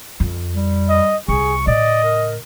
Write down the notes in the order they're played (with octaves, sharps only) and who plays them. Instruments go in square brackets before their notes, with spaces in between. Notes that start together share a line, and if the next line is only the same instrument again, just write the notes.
[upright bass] F2
[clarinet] G3
[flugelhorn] D#5
[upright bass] C2 [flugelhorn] G#4 [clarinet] C#6
[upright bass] A2 C#3 [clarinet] D5 [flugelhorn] D#5
[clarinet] A#4